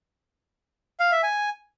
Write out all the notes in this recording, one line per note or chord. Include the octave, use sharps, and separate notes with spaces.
F5
E5
G#5